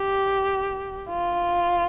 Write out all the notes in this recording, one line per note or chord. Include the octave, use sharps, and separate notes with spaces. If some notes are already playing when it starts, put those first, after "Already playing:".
Already playing: G4
F4